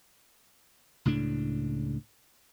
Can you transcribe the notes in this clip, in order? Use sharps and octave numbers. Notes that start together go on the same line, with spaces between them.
C#2 A2 C#3 D4